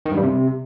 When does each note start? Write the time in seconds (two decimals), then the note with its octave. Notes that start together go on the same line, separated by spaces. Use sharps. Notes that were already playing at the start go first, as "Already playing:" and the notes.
0.06 D#3
0.11 G2
0.17 G3
0.23 C3